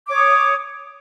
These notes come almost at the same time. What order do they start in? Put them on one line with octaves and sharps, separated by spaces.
D6 C#5 D#6